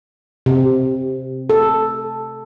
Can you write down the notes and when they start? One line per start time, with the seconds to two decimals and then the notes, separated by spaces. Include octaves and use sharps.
0.46 C3
1.50 A4